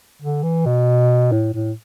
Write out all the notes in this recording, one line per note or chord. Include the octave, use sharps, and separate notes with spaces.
D3
E3
B2
A2
A2